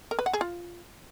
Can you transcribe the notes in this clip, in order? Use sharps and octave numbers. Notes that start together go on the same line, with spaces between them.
A#4
B4
F#5
G#4
F4